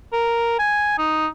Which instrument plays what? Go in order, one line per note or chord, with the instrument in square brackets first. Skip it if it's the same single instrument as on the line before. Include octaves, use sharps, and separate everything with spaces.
[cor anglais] A#4
G#5
D#4